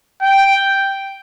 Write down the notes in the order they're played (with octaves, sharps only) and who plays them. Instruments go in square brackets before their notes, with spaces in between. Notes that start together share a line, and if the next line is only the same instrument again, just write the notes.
[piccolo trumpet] G5